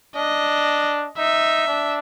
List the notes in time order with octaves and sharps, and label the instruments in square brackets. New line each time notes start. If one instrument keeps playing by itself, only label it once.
[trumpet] D4 [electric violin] D#5
[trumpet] D#4 [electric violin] E5
[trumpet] D4